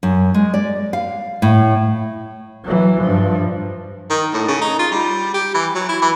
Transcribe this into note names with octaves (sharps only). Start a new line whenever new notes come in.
F#2
G#3
D5
F5
A2
E3 F#3
G2 F3
D#3
A2
C#3
D#4
F4
G3
G4
E3
F#3
E4
E3